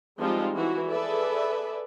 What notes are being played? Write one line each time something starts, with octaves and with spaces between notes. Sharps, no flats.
F3 G3 G#3 C4 D#4 F4
E3 E4 F#4
G#4 A4 B4 D5 E5